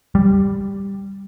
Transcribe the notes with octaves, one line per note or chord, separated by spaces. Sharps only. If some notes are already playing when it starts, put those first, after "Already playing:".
G3